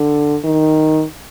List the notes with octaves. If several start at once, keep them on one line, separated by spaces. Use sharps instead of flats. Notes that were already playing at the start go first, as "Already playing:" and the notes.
Already playing: D3
D#3